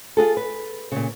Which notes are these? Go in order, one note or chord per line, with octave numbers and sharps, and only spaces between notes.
F4 F#4 G#4 A4
B4
A#2 C#3